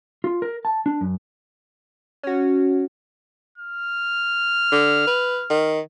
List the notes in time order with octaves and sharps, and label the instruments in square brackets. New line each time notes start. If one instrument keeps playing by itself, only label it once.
[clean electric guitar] F4
A#4
A5
D4
F#2
[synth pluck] C#4 F#4
[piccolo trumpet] F6
[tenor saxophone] D3
B4
D#3